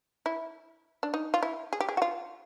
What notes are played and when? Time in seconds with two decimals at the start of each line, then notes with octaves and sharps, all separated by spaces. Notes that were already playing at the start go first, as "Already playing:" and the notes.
0.26 E4
1.03 D4
1.14 D#4
1.34 F4
1.43 E4
1.73 G#4
1.80 G4
1.89 G#4
1.97 F#4
2.02 F4